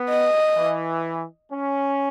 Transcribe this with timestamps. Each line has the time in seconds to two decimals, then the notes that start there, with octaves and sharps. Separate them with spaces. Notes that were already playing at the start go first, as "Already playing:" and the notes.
Already playing: B3
0.09 D#5
0.57 E3
1.51 C#4